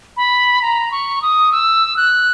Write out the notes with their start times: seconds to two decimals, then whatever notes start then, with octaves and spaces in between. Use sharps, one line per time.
0.17 B5
0.62 A#5
0.91 C#6
1.22 D#6
1.52 E6
1.97 F#6